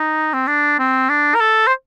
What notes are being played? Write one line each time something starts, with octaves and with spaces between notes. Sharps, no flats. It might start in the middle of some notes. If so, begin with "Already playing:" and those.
Already playing: D#4
C4
D4
C4
D4
A#4
A4
C5